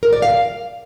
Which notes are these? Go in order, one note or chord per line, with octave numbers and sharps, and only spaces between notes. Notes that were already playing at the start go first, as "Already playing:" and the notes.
A#4
D5
F5